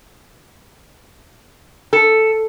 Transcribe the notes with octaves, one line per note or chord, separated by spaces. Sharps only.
A4